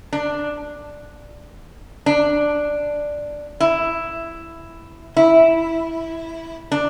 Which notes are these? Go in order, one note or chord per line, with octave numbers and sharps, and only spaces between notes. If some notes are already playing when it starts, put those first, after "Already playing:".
D4
D4
E4
E4
D4